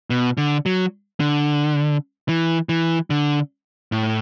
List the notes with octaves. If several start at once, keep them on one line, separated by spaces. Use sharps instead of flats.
B2
D3
F#3
D3
E3
E3
D3
A2